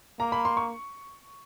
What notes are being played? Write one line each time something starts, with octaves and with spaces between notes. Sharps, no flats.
A#3 A#5
B5
C6
C#6